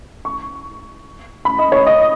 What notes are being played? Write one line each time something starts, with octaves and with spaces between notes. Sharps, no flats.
C#6
B5
D#5
C#5
D#5